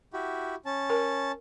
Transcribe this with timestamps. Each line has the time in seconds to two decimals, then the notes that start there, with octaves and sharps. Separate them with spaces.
0.13 E4 F#4 G4
0.66 C#4 A5
0.90 A#4